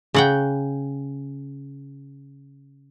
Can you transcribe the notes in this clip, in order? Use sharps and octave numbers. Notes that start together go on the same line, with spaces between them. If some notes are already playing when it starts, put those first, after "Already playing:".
C#3 F#5 G5